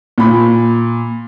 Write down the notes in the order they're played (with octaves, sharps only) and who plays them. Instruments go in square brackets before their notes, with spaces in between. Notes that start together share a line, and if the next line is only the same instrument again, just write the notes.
[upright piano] A#2 B5